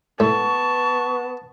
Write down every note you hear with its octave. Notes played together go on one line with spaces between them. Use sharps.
A2 B3 A5 C#6